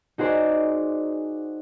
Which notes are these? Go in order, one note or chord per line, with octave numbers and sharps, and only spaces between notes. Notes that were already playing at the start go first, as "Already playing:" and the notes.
D#4 F#4 G#4 C5 D5